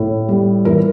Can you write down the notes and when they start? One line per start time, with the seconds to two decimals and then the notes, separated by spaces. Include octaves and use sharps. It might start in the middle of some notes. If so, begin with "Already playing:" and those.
Already playing: A2
0.29 G3
0.65 E3 A#4